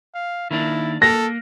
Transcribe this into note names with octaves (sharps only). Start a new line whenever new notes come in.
F5
D#3 A#3 D4 E4
A#3 A4 A#6